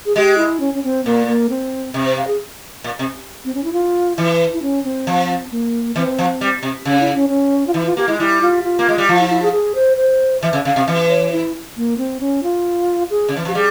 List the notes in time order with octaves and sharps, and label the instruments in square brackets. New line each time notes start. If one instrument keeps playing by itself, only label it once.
[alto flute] G#4
[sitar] G#3 [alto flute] G4
[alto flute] E4
C#4
C#4
C4
[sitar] A#2 [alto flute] A#3
[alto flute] A#3
C4
[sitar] C3
[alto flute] C5
F5
G#4
[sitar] A#2
C3
[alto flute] C4
C#4
E4
F4
[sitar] E3 [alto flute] E4
[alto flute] E4
C#4
C4
[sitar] F3
[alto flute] A#3
[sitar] E3 [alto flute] C4
[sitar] F3
G3
C3
[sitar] C#3 [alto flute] C#4
[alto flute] E4
C#4
C#4
F4
[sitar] E3 [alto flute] E4
[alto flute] F4
[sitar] A#3 [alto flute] G4
[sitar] G#3 [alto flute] E4
[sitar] G3 [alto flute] E4
[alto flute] F4
F4
[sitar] A#3
G#3
G3
[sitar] F3 [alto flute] F4
[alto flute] E4
E4
G#4
G#4
C5
C5
[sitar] E3 [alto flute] E5
[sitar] C#3
[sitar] C#3 [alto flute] F5
[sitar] C3
E3
[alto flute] C#5
E4
A#3
C4
C#4
F4
G#4
[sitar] C#3
E3
[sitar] F3 [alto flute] G4
[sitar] G3 [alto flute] G#4